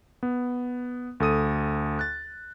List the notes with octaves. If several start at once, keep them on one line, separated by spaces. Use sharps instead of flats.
B3
D2 A4 D#6 D#7
F#6 A6